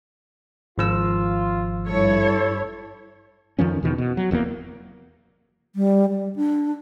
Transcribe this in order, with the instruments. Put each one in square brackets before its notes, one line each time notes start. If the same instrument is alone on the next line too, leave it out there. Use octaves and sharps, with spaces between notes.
[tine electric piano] G#1 F3 E6 [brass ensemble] F4
[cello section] G2 E4 C#5 [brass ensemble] A4
[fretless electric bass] F2 D#3 F3 C#4
E2 B2 D#3
B2
F#3
F1 E2 C3 A#3
[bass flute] G3
G3
D4